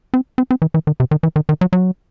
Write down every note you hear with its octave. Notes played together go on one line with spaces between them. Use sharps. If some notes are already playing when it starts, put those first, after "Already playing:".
C4
C4
C4
E3
E3
D#3
C3
D#3
E3
D#3
D#3
F#3
F#3